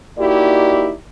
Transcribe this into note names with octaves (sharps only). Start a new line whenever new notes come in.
A#3 D#4 E4 F#4 G4 D5